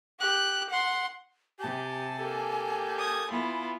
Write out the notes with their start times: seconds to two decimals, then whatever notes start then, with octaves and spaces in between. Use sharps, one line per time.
0.20 G4 F#6
0.70 F#5 C6
1.59 C3 G4 G#5 A5
2.19 A#3 G4 A4
2.97 D#6 G#6
3.30 B3 E4 F4